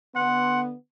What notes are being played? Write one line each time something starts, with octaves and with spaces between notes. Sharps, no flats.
D3 B3 F#5 C6